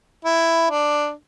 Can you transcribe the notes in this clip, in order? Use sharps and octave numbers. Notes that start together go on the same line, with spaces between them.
E4
D4